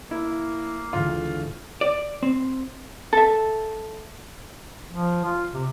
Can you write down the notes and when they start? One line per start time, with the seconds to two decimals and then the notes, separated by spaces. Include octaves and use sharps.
0.11 A#3 E4
0.93 D2 G#2 E3 F4
1.81 D5
2.23 C4
3.13 A4 E5
4.92 F3
5.25 F4
5.54 C3